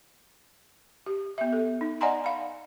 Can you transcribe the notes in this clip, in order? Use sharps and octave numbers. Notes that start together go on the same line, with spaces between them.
G4
B3 E5
A4
D#4
D5 D#5 F#5 G#5 A#5 C6
F5 B5